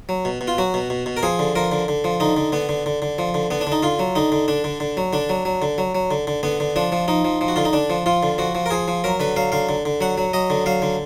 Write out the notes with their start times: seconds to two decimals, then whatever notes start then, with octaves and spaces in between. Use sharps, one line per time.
0.09 F#3
0.25 B2
0.41 B2
0.48 F4
0.58 F#3 F#4
0.74 B2
0.90 B2
1.06 B2
1.17 A#4
1.23 F3 G#4
1.39 D3
1.55 F3 A#4
1.72 D3
1.88 D3
2.04 F3
2.20 D3 D#4
2.37 D3
2.52 D3 B3
2.69 D3
2.86 D3
3.02 D3
3.18 F3
3.34 D3
3.51 D3 B3
3.61 D4
3.67 D3 D#4
3.83 D3 F4
3.99 F#3
4.16 D3 D#4
4.32 D3
4.48 D3 D4
4.64 D3
4.80 D3
4.97 F#3
5.13 D3 D4
5.29 F#3
5.45 F#3
5.62 D3
5.78 F#3
5.95 F#3
6.11 D3
6.27 D3
6.43 D3 B3
6.60 D3
6.76 F3 D4
6.92 F3
7.08 F3 D#4
7.25 F3
7.41 F3
7.48 F#4
7.56 D3 F4
7.65 D#4
7.73 D3 D4
7.90 F3
8.06 F3 F4
8.23 D3
8.38 F3 F#4
8.55 F3
8.66 A#4
8.71 F3 G#4
8.88 F3
9.04 F#3 A#4
9.20 D3 B4
9.36 F#3 F5
9.52 D3 F5
9.69 D3
9.85 D3
10.01 F#3 F#5
10.18 F#3
10.33 F#3 D#5
10.50 D3
10.66 F#3 F5
10.82 D3